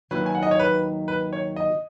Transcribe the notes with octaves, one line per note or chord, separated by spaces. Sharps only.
D#2 D#3 F#3 B4
G#5
F#5
D#5
C#5
B4
B4
C#5
D#5